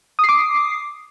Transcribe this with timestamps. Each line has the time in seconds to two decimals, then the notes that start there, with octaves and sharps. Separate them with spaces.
0.19 D#6
0.24 C7
0.29 D6